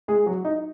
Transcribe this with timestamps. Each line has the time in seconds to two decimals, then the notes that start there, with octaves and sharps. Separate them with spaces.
0.08 G#3 G#4
0.26 F#3 F#4
0.45 D#4